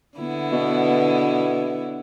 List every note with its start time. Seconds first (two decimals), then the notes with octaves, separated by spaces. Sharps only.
0.18 D3 B3 E4
0.52 B2